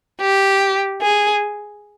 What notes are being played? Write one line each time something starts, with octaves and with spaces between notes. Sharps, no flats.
G4
G#4